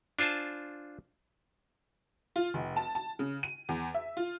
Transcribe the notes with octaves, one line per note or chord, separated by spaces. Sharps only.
D4 F4 C5 G#5 A5
F4
F1
A5
A5
C#3
D#7
E2
E5
F4